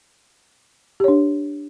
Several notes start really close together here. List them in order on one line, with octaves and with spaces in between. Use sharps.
G4 C#5 D4